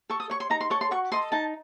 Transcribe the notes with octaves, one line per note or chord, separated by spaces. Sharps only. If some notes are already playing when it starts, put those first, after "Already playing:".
A4 C#6
D#6
C#5 C#6
C6
D#4 A#5
C6
A4 C#5 C#6
C6
F#4 C#6
A4 D#5 C6
D#4 A5